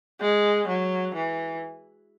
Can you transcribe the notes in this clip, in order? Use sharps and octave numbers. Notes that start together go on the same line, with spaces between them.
G#3
F#3
E3